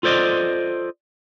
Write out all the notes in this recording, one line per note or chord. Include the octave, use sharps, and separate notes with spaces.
F4 A4 C5 D5 D#5